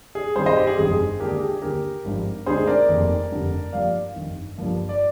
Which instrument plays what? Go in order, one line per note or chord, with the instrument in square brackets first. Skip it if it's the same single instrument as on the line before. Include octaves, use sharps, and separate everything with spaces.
[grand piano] G#4
G2 D#3 G3 C4 G#4 C5
C5 D#5
G4
G#4
G1 F2 C3 D#3 G#3 G#4
D#2 D3 G#3 D4 G4 A#4
G#4
G4
G#4
D#2 D3 G3 G4 A#4
G#1 G2 F3 C4 D#4
D2 D3 G#3 C4 D#4 G#4 C5
A#4 D5
F1 F2 D#3 A#3
F1 F2 D3 G3
G2 F3 A#3 D5 F5
G1 F2 D#3
G1 G2 F3 A#3
D5